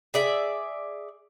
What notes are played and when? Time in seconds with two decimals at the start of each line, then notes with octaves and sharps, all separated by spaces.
0.14 G#4 D5 E5